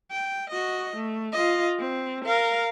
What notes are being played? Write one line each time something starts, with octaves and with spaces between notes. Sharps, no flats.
G5
F#4 D#5
A3
F4 D#5
C4
A#4 F5